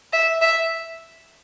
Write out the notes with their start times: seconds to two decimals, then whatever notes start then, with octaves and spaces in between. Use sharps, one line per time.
0.13 E5
0.42 E5